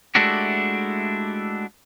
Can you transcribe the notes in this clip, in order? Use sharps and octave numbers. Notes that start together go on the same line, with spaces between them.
G#3 A3 D4 E4 F#4 G4